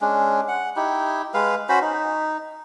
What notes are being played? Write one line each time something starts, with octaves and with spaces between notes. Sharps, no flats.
G#3 C#4 D4
F#5
D#4 E4 G4
G#3 B4 F5
C#4 F#4 C5 B5
D#4